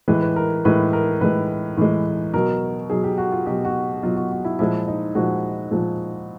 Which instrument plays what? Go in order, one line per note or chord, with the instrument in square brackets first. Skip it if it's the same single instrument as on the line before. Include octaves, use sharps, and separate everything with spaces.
[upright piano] A2 E3 G#3 B4
B4
A#4
A2 E3 G#3 B4
A#4
A2 E3 G#3 B4
A2 E3 G#3
B2 F#3 A#4
B2 F#3 G#4
G4
F#4
F4
B2 F#3 G4
F#4
B2 F#3 F4
F#4
F#4
E4
A#2 F3 G#3 E4
D#4
A#2 F3 G#3 F#4
A#2 F3 G#3